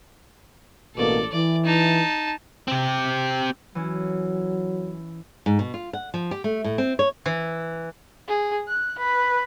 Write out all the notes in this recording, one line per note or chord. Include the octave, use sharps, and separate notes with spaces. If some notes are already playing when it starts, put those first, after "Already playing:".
A1 B2 A#3 A4 D5
E3 D5
D#4 A5
C4 G4
E3 F#3 C#4
G#2
B2
F4
F#5
F3
G4
A3
A2
C4
C#5
E3
G#4
F#6
B4